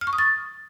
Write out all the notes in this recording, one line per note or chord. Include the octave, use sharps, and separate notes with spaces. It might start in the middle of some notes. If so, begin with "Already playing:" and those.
F6
C#6
D#6
A6